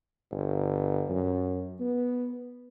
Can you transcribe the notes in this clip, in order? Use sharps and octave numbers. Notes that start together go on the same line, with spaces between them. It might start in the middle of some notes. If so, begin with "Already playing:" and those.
G1
F#2
B3